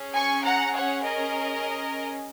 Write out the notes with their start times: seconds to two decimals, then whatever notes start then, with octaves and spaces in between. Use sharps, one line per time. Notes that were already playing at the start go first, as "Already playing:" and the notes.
Already playing: C#4 G#4
0.14 G#5 C#6
0.44 F#5 A#5
0.74 C#5 F#5
1.02 A#4 D#5